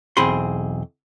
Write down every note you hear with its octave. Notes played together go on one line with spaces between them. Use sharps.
B1 E2 C4 G#4 B5 C6